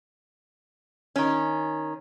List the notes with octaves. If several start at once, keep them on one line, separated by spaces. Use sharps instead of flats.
D#3 C#4